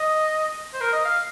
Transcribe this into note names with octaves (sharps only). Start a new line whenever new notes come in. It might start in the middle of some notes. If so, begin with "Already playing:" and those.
Already playing: D#5
C5
A#4
D#5
F5